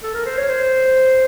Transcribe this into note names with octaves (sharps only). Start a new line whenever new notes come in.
A4
A#4
C5
C#5
C5